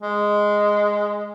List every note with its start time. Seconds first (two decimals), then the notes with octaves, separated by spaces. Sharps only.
0.02 G#3